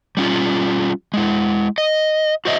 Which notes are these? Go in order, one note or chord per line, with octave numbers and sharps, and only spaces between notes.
G3 C#4 F4
G#3 E4
D#5
F#4 C5 D#5 E5